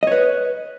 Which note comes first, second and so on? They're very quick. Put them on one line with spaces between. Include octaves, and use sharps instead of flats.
D#5 C#5 B4